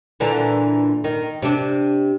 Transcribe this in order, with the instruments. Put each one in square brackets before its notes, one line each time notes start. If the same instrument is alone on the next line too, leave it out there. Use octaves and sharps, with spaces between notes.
[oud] A#2 D3 E3
D#3
C3 D4